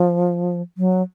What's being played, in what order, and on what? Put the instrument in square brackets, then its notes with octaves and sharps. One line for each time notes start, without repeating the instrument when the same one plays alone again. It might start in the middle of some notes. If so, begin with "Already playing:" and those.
Already playing: [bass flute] F3
F#3